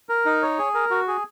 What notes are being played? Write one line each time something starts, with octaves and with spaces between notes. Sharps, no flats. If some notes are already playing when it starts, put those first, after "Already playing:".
A#4
D#4
C#5
G#4
A#4
F#4
G#4